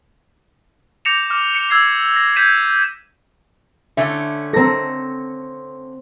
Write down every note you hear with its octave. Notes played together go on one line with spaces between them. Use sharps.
D6 G6 A#6 C#7 E7 F7
D6 F6
C#7 F7
E6 G#6 C7
A#6
G6 G#6 B6 D#7 E7
D3 A3 C#4 E5
C4 A4 A#5 A#6